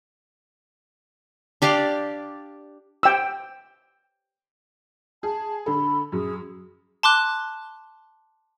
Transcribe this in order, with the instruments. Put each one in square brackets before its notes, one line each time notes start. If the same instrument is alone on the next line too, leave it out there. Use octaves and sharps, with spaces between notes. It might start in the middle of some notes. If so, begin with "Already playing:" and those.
[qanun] D4 G4 D5 F5
[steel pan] G5 E6
[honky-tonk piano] G#4 [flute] A5
[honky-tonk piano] D3 A4 [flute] B5
[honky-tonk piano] F#2 [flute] G#4
[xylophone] A5 C6 D6 F#6